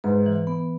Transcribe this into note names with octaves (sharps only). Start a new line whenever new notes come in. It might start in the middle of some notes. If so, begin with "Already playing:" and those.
G#2 B4
E3
B3